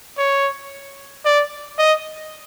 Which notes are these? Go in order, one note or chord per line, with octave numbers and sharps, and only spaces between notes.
C#5
D5
D#5